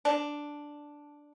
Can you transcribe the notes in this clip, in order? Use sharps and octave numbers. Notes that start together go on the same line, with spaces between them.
D4